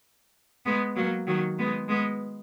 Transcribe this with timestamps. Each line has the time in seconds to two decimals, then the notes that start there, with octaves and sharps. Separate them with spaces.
0.65 G#3 B3
0.96 F#3 A#3
1.27 D#3 F#3
1.59 G#3 B3
1.89 G#3 B3